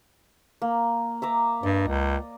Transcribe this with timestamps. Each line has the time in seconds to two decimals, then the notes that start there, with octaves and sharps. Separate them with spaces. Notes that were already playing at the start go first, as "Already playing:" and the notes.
0.62 A#3
1.22 E5 A#5 D6
1.63 G2 D5 D#5
1.87 C#2